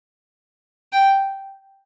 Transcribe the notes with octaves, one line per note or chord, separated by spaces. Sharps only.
G5